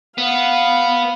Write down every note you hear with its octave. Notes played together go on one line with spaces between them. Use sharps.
B3 F5